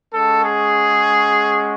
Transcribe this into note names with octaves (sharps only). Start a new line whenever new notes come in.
G#3 C#4 F#4 A4
G#4